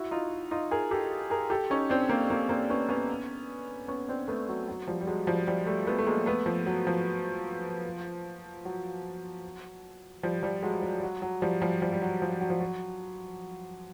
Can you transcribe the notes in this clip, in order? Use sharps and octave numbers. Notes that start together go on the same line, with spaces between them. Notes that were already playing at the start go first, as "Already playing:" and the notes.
Already playing: E4 F#4
D#4 F4
D#4 F4
G#4 A#4
G4 A4
G#4 A#4
G4 A4
C#4 D#4
C4 D4
A#3 C4
A#3 C4
A#3 C4
B3 C#4
B3 C#4
B3 C#4
C4 D4
A3 B3
F#3
F#3
F3 G3
G3
F#3 G#3
F3 G3
F3 G3
G3 A3
A3 B3
A3
G#3 A#3
A3 B3
F3
F#3
F3
F#3
F3 G3
F3 G3
F#3 G#3
F#3
G3
F#3
F#3
F3 G3
F3 G3
F3 G3
G3
F#3
F3
F#3
F3
F#3